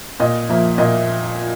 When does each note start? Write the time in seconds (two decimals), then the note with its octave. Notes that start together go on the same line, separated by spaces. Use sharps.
0.20 A#2 D#5
0.49 F3 A#3 E5
0.78 A#2 D#5